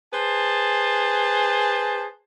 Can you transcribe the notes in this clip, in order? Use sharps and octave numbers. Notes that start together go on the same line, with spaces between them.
G#4 B4 C5 A5